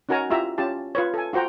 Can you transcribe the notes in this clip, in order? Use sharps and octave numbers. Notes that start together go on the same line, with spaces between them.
C#4 D#4 F#4 A#4 G#5 A#5
E4 F4 G4 E5 A#5
C#4 F4 G4 A5
F4 B4 C#5
A4 G#5
F4 F#4 C5 G5 A#5